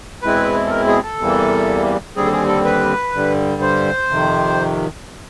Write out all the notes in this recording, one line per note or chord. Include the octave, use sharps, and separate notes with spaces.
E2 B2 G#3 C4 E4 B4
A4
A#4
G#4
A4
E2 C3 E3 G3 A#3
D#2 D3 G3 C4 G#4
A4
G#4
A4
B4
G2 D3 G3
C5
F2 C3 D#3